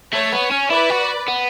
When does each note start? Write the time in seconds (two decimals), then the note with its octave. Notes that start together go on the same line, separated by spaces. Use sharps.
0.13 A3 C#5
0.32 B3
0.51 C#4
0.70 E4 B4 D5
0.90 F#4
1.28 B3